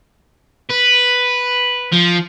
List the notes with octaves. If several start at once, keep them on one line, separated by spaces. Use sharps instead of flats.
B4
F3